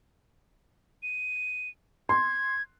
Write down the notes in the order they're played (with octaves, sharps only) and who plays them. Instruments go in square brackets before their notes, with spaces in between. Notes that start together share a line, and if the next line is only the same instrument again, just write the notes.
[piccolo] D#7
[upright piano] C6 [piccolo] G#6